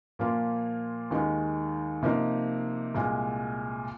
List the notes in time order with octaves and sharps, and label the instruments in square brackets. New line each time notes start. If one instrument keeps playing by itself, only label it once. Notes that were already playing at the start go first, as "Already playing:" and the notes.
[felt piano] A#2 F3 A#3 F4
D#2 D#3 G#3
C3 F3 A#3 D#4
C2 A#2 G#3